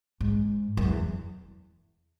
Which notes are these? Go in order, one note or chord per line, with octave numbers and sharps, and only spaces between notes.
G#2
F#2
E2